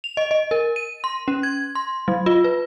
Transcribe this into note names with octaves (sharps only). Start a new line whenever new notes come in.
F7
D#5
D#5
A#4
D#7
C6
C#4
G#6
C6
F#3
F4
B4